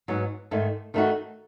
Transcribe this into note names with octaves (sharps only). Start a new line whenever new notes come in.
G#2 F#3 B3
G#2 D#3 A3
D#3 A3 D#4 F#4